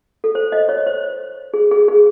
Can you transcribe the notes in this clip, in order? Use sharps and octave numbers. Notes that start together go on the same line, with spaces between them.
A4
C5
D#5
C#5
C5
G#4
G#4
G#4